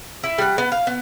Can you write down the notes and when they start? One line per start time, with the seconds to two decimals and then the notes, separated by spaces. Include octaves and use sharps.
0.24 E4
0.38 G3 F#5
0.58 B3
0.72 F5
0.87 B3